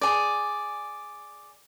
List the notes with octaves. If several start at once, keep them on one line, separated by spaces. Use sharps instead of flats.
G#4 D5